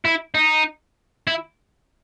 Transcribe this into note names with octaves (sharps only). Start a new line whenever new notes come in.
E4
D#4
E4